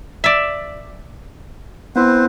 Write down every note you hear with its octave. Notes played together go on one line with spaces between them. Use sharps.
D5 E5
B3 C4 E4 B4 C5